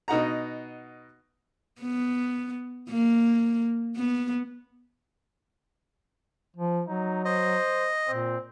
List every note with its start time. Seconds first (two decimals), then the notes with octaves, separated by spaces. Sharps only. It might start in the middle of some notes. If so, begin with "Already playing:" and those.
0.08 B2 D#4 F#5 A#5
1.81 B3
2.89 A#3
3.96 B3
6.57 F3
6.87 F#3 D#4
7.25 C5 D#5
8.08 A#2 C4